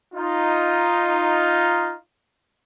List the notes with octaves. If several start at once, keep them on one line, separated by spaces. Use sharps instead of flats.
D#4 F4